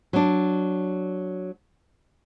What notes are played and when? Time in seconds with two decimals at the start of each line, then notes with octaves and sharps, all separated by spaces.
0.13 F#3 D4